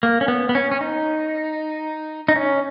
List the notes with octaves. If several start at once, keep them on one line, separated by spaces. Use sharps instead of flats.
A#3
C#4
B3
B3
C#4
C#4
D#4
D#4
C#4